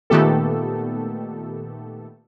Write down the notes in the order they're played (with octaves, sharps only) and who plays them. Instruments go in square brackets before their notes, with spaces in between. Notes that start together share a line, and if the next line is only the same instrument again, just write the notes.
[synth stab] A#2 D#3 A3 B3 G4 A4